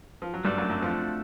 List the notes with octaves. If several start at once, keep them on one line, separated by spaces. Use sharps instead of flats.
F3
F#3
G2 G3 A3 D4 F#4 A4 D5
F#2 F#3
F#2 F#3
F2 F3